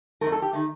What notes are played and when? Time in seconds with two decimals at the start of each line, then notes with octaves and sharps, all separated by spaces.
0.21 F2 D#3 A3 A#4
0.32 A4
0.42 G4
0.53 D#3 A3